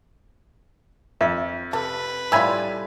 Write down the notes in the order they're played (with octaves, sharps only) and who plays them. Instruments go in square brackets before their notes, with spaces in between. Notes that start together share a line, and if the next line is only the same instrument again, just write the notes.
[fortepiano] F2 [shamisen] E5
[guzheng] C3 [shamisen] A4 [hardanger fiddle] B4
[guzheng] A2 G3 [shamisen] F4 G4 [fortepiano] E5 G#5 B5